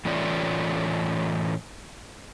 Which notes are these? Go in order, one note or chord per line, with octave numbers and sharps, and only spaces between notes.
A2 E3 A3 C#4 F4 D5